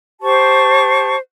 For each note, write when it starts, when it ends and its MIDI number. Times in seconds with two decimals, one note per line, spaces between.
0.21 1.17 67
0.21 1.17 72
0.21 1.17 81
0.21 1.17 85